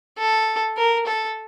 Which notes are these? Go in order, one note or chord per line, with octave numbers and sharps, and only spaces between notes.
A4
A#4
A4